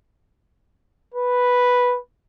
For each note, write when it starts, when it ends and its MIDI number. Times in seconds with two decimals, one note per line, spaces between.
1.14 1.98 71